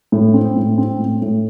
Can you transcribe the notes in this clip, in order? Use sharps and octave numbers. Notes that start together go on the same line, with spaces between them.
A2
C4
A2
C4
A2
A2